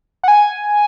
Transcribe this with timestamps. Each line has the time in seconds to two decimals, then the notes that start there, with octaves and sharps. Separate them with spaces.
0.23 F#5
0.28 G#5